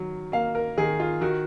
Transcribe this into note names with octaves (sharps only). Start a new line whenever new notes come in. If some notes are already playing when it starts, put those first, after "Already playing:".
Already playing: D#3 F#3
A#3 F5
A#4
D#3 G#4
F4
D#3 F#4